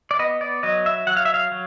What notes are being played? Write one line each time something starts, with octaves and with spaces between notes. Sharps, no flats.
D5
B3 D#5
D5
F#3 D#5
E5
F#3 F#5
F5
E5
F5
F#3